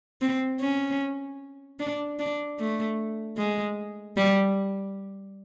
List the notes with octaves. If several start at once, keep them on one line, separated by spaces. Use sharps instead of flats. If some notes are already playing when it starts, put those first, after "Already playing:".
C4
C#4
D4
D4
A3
G#3
G3